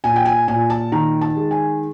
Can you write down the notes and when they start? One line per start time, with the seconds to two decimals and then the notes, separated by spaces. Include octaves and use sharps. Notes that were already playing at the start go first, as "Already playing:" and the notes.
0.04 A#2 G#5
0.16 G5
0.26 G#5
0.48 A#2 G#5
0.70 A5
0.92 D#3 A#5
1.21 A5
1.36 G#3
1.51 G#5